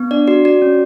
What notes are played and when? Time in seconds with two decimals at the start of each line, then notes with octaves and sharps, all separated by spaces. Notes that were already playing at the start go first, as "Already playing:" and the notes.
Already playing: B3
0.11 D4 D5
0.28 F#4 D5
0.45 F#4 D5
0.62 C#4